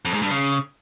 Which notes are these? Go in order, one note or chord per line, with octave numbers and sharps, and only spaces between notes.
F2
G#2
G2
C#3